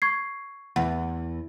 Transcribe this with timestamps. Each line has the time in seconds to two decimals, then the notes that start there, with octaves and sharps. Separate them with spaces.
0.02 C#6 G#6 C7
0.76 E2 F#5